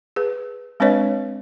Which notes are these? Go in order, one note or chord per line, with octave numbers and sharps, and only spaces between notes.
G#4 B4
G#3 C4 D4 B4 C#5 D#5